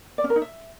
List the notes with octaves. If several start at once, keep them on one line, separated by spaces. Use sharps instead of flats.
D5
C#4
A#4
D#4
E5